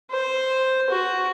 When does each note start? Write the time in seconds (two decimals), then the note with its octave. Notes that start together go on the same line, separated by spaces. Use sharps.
0.11 C5
0.91 F#4